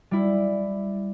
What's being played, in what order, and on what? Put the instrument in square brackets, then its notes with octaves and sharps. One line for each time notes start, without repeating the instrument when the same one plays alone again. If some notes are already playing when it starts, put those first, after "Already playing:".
[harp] G3 E4